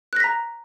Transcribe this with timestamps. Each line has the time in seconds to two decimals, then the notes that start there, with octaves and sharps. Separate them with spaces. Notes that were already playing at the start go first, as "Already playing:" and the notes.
0.13 F#6
0.16 A#6
0.20 B6
0.24 A#5